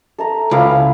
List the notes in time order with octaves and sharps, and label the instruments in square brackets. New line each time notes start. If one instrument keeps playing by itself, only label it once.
[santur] A4 E5 A#5
[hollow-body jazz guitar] C#2 [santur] E4 B4 F5